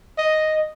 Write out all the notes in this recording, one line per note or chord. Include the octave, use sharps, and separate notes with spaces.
D#5